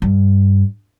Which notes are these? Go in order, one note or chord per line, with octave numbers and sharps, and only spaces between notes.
G2